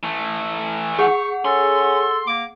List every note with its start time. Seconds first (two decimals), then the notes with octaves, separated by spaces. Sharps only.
0.03 E3 A3
0.99 G#4 F#5 C#6
1.45 C#4 A4 C6
2.27 A#3 D6